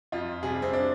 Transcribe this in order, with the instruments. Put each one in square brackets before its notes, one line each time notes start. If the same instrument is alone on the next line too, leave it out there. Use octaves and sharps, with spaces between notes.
[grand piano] F2 F4
C3 G3 G#4
C4
D4